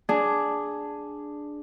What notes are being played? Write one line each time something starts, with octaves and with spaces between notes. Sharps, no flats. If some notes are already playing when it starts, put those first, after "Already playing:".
D4 G#4